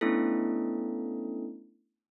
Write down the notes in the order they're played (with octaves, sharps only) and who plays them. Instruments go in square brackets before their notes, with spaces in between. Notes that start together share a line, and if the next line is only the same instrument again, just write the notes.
[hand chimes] A3 B3 C#4 D4 E4 A4